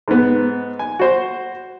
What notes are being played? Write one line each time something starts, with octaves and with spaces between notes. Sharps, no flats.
G#2 B3
G#5
F#4 C5